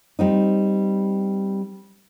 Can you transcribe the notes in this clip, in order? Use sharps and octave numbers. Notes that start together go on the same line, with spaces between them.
G3 C4 D#4